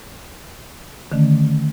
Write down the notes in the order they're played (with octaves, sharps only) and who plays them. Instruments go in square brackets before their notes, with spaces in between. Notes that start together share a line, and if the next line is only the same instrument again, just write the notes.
[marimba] D3 D#3 A3 C#4